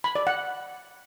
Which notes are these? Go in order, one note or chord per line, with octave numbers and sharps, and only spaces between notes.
B5
D5
F#5